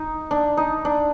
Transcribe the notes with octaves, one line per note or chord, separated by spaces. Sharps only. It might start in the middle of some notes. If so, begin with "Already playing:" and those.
Already playing: D#4
D4
D#4
D4